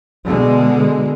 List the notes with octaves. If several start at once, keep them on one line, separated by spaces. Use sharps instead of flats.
B2 D3 G#3